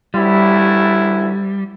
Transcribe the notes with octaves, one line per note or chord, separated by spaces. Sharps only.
A1 D2 G3 E4